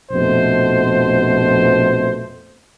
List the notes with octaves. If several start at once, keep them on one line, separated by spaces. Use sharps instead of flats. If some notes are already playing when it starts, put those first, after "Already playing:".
A#1 F2 B2 A3 C5